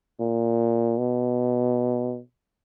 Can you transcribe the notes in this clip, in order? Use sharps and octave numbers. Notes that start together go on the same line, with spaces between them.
A#2
B2